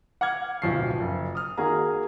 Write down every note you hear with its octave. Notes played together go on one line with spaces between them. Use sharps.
F#5 D6 F6 G#6
D1 B1 F3 C#6 C7
F#1
D#6 F6
D#3 A#3 F#4 G#4 A#5